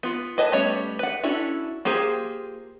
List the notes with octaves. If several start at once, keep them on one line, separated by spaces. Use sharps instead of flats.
B3 F4
B4 D#5 G#5 A5
G3 A3 B3 C#4 C#5
B4 F#5
C#4 D4 E4 F#4 A4
A#3 F4 G4 G#4 C5